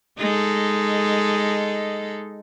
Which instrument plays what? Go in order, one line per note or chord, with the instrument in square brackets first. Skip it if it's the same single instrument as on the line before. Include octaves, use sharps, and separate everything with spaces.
[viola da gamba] G#3 D#4 A4